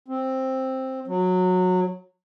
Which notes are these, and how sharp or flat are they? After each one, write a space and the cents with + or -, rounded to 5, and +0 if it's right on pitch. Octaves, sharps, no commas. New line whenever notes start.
C4 +5
F#3 -15